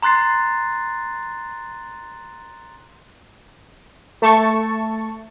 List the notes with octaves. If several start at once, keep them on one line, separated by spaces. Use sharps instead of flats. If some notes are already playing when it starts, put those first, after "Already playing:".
A#5 C6 F#6 A6 C7
A3 A5 C#6